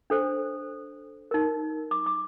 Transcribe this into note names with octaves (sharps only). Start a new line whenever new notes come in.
D4 A4 C5
D#4 A#4
D6
D6